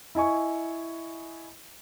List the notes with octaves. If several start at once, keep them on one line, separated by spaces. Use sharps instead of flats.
E4 D#5 G#5 C#6